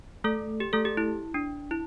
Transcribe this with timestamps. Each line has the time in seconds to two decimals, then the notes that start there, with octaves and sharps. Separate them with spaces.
0.24 A3 A4
0.60 G4
0.73 A3 A4
0.85 G4
0.97 E4
1.34 D4
1.71 E4